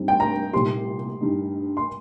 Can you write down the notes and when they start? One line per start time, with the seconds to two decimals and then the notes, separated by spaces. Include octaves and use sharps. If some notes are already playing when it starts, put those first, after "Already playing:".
Already playing: G2 G3 C4 D#4
0.08 G5
0.20 A#5
0.53 C2 A#2 G3 D#4 G4 C6
1.21 G2 G3 D#4
1.77 C6